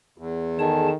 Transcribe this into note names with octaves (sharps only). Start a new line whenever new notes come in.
E2
D#3 G#4 A4 G#5 A5